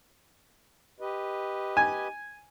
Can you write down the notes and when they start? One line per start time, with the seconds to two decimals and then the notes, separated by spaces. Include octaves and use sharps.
1.00 G4 B4 D#5
1.77 G#5